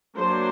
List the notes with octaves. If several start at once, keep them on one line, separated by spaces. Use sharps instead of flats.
F#3 A#3 D4 C5